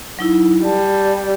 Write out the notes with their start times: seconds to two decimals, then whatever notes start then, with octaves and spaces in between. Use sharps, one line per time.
0.19 F#3 D#4 E4
0.64 G3 A5